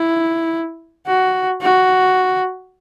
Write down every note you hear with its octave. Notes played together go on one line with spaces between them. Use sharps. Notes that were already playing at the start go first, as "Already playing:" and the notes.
Already playing: E4
F#4
F#4